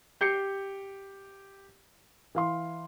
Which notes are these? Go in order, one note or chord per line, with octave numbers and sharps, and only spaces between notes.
G4 G6 C7 C#7
E3 F5 C6